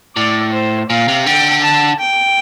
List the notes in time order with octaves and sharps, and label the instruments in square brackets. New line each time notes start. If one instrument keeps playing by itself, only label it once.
[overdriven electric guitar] A2 [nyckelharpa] D5
[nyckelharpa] C5
[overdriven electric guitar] A#2 [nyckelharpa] F5
[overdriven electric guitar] C3
[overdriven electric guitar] D3 [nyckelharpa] G5
[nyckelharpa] A5
G5